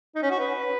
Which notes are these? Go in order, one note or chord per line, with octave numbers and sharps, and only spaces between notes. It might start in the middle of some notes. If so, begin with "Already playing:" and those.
D#4
C#4
F#4
B4